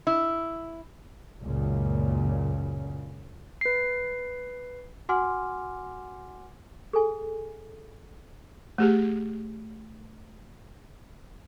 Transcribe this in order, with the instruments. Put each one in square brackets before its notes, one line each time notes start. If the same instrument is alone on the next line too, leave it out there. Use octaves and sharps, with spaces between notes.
[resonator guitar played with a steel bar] E4
[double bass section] C#2 F#2 A#2 C#3
[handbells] B4 C7
[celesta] F#4 F#5 G#5 C6 D6 F6
[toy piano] G#4 A4 G#5
[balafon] A3 G4 G#4